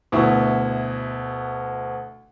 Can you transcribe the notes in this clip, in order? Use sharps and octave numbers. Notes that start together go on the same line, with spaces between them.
D2 B2 E4